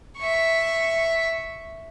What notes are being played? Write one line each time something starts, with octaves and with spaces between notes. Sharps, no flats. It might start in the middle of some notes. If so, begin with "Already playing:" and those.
E5 C#6